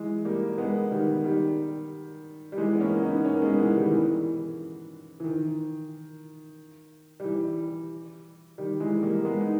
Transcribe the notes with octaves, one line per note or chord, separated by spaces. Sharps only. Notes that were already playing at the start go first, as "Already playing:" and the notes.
Already playing: E3 G#3
G3 A#3
G#3 B3
D#3 G3
D#3 G3
G3
E3 G#3
B3
A#3 C#4
B3 D#4
A#3 C#4
G#3 B3
E3 G#3
D#3 G3
E3
E3
D#3
G3
E3
D#3 G3
E3 G#3
G3 A#3
A#3
G#3 B3
D#4